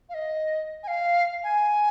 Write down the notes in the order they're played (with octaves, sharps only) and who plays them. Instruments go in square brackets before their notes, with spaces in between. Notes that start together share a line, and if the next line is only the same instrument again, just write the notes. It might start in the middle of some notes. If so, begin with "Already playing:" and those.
[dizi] F5
D#5
G#5
F5
G#5